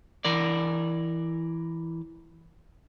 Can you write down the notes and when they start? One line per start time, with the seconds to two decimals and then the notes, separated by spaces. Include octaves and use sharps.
0.25 E3 A#4 D5